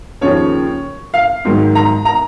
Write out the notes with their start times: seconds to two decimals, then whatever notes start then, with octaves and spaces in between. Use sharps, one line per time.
0.21 D#2 C#3 F3 C#5
1.14 F5
1.45 G#2 D#3 F#3
1.75 A#5
2.05 A#5